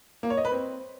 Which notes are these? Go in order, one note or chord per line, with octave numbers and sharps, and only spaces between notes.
A#3
C#5
D#5
B4
C4